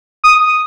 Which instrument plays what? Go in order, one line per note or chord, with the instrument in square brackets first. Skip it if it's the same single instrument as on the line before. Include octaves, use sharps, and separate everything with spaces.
[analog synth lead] D#6